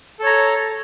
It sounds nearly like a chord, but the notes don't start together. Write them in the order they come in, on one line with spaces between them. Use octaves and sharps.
A4 C#5 A#5